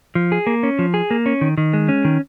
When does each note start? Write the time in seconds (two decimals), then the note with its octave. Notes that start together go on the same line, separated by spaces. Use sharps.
0.15 F3
0.32 G#4
0.47 A#3
0.63 C#4
0.79 F3
0.94 G#4
1.11 A#3
1.26 C#4
1.41 D#3
1.58 D#3
1.73 G#3
1.89 C#4
2.05 D#3